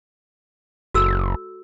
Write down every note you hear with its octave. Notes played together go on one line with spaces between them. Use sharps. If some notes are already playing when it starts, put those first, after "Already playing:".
F#1 F#4 A4 E6